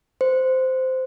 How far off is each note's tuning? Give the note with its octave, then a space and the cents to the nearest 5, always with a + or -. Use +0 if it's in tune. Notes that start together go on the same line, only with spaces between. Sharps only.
C5 -15